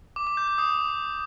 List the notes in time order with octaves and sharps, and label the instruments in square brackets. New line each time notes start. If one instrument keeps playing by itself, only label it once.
[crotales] D6
D6
G6
G6
D#6